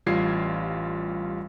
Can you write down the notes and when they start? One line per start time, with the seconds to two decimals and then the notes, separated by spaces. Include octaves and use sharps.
0.06 A1 G3 F4 G#6 C7